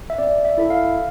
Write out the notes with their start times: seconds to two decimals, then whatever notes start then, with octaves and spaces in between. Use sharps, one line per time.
0.10 E5
0.18 C4 D5
0.45 E5
0.58 E4 A4 E5
0.70 F5